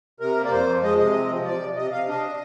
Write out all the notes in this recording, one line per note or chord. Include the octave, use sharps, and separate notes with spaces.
C3 A#4
A#3
D5
F2 C5
F3
G#3 D#5
C3 D#5
C4
F3
C3 D5
C3
C3 D#5
C3 F5
D4 D#5